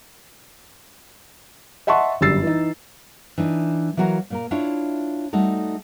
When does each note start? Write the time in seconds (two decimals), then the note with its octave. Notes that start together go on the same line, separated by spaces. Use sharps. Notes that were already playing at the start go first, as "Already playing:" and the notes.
1.87 D#5 E5 F#5 A5 C6 C#6
2.21 G1 F#2 G3 E6 A6 C7
2.43 E3 D#4
3.38 E3 D4 D#4
3.97 E3 F#3 F#4 A#4 F5
4.30 A#2 A#3 A#4
4.51 D4 E4 F4 C#5 D5 E5
5.33 G3 A3 D#4 F#4 A4